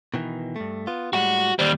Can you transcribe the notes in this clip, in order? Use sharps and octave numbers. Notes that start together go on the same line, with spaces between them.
B2 D#3 E3
G2 A3
B3 F4
A2 G3 G#3 F#4 F#5
D#2 G3 C5 D5